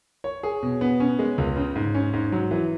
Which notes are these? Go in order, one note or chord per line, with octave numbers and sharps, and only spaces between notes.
C#5
G#4
B2
B3
C#4
G#3
C#2
C#3
G#2
C#4
G#2
F#3
E3